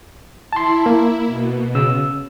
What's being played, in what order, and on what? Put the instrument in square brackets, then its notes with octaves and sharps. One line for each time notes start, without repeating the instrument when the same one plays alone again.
[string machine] E4 [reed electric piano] A5 C6
[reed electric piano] A#3
[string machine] B2
[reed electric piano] C#3 E6